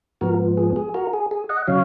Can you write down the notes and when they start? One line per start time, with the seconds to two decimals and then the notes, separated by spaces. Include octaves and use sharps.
0.21 G#2 F3 B3 F#4 A#4
0.57 G#4
0.76 G#4
0.94 F#4 A#4
1.13 G#4
1.31 G#4
1.49 D#5 F#5
1.67 C#3 F#3 C#5 F5